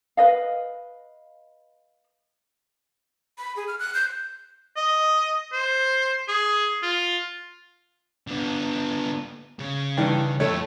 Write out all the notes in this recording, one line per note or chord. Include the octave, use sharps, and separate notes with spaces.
B4 D#5 F5
B5
G#4
F6
F#6
G6
D#5
C5
G#4
F4
D3 B3
C#3
G2 D#3 E3
F2 A3 C#5